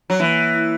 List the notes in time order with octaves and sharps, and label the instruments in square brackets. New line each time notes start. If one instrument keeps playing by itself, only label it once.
[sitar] F#3
[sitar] E3 [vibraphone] A#3
[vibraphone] E4